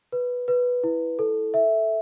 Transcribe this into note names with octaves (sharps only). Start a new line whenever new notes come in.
B4
B4
E4
A4
E5